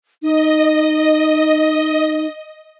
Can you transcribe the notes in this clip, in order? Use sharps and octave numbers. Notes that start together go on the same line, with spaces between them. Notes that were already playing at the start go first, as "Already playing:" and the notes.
D#4 D#5